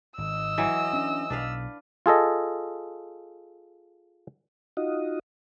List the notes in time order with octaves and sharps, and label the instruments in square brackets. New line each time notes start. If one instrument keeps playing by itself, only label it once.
[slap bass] G#1 [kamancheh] D#5 E6
[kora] E3 F#3
[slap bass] C#4 D4
[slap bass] B1 [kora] D4 B4 F5
[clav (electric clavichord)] F4 G#4 A4 D#5
[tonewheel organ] D#4 F4 F#4 D#5